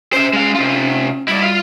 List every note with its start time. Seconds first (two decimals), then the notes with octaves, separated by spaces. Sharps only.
0.13 C#4 C5 E5
0.33 G#3 F5
0.55 C3 F4
1.28 G3 E4 D5
1.43 F4 F5